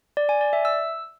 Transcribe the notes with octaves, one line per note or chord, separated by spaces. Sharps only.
D5
G#5
D5
E5
E6